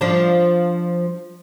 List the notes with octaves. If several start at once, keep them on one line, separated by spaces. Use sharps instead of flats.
F3 D4